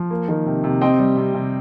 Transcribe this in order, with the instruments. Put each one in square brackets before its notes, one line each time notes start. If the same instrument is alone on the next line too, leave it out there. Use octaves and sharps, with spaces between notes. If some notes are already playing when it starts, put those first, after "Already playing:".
Already playing: [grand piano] F3
A#3
D#3
C3
C3
C4 D#5 G5
G3
C3
C3